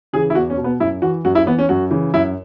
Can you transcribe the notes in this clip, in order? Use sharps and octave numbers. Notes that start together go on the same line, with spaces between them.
C#3 E3 G#4
E4
E2 F#4
C#4
B2
B3
F#2 E4
E3 F#4
F#2 F#4
E4
E3 B3
C#4
F#2 F#4
C#3 E3
F#2 E4